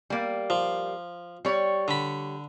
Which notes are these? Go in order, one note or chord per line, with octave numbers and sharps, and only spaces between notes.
G3 A#3
F3
G3 C#5
D3 B5